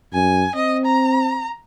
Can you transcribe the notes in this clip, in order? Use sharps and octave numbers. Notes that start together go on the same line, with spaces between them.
F#2 G#5
C4 D#5
A#5